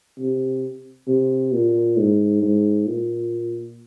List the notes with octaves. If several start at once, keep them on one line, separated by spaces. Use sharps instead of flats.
C3
C3
A#2
G#2
G#2
A#2